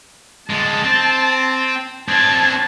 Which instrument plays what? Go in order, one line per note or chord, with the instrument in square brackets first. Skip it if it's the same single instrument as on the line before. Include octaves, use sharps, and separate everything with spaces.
[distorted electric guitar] D3 G#3 [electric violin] A5
[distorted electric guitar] C4
[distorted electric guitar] C4 D4 [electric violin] A5 G#6